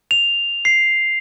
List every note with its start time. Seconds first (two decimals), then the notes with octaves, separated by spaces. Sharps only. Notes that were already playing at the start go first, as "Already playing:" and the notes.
0.11 F7
0.65 C7